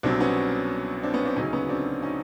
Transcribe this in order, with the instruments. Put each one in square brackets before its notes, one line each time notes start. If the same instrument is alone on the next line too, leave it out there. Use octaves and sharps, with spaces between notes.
[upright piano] C2 B2 F#3 C4 D4
B3 C#4
C4 D4
B3 C#4
C4 D4
D2 C#3 F#3 C#4 D#4
B3 C#4
C4 D4
C#4 D#4